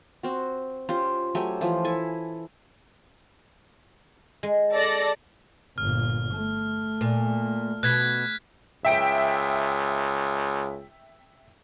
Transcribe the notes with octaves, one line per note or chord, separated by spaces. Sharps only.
C4 F#4
C#4 F4 G4 C5
F#3 A3 G4 G#5
E3 F3
E4 A4 G#5
G#3
A4 D5 A#6
G1 A#2 F6
A3
A#2
B2 F#6 G#6 B6
C#2 E5 G5 D7